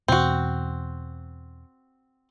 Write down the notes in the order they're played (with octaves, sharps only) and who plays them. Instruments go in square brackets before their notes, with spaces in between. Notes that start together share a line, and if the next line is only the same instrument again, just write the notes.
[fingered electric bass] E2 B2 E3 [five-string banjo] C4 F#4